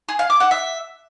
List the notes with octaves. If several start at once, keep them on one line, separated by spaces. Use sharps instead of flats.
G#4
F5
D6
F#5
E5